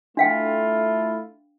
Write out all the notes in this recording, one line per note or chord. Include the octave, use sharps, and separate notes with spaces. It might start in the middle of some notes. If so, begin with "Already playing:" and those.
A3 D4 E4 F4 F5 G5